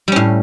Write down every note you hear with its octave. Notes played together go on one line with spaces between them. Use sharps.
A2 G3 C#4